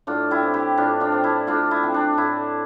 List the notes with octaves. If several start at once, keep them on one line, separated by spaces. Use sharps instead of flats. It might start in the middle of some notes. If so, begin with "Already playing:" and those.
A2 D4 F4
E4 G4
F3 C4
E4 G4
A2 D4 F4
D4 F4
F3 C4
E4
A2 D4 F4
E4
F3 C4
D4
A2 E4